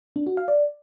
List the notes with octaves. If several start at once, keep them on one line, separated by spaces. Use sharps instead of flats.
D4
F#4
F5
D5